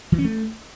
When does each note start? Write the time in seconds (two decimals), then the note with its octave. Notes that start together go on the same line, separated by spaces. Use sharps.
0.12 E3
0.18 C#4
0.25 A3